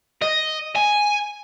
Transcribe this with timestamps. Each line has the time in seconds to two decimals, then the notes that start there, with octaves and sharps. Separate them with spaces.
0.22 D#5
0.75 G#5